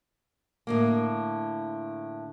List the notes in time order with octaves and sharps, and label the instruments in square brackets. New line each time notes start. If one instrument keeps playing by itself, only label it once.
[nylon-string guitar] A2 D3 A#3